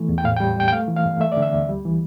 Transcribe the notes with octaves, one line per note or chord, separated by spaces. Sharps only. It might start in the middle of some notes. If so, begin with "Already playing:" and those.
Already playing: E3 A3
E2
G5
A2 F5
G5
G3
G3 G5
G5
A3 F5
E3
F5
G2
A3 E5
D5
D3
E5
D2
G3
E3